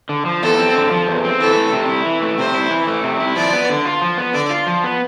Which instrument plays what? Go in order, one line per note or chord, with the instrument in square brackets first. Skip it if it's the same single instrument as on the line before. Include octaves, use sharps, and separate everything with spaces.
[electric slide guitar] D3
F3
[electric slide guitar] E2 [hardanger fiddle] A4
[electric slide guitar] C4
D3
F3
E2
C4
[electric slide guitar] E3 [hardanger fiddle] A4
[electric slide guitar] A3
C3
E4
E3
A3
[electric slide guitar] C3 [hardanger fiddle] C5
[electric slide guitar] E4
E3
A3
C3
E4
[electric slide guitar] F3 [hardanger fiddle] D5
[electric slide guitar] B3
D3
F4
F3
B3
[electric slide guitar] D3 [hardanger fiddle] D5
[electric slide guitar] F4
F3
B3